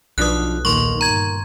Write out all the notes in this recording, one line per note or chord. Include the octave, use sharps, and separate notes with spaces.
B1 F3 D4 B4 D#6 F#6
D#2 A#2 D#3 A#3 C6 C#6
G1 A#5 G#6